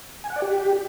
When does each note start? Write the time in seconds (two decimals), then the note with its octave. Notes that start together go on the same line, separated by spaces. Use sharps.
0.24 G#5
0.30 F#5
0.36 D5
0.42 G4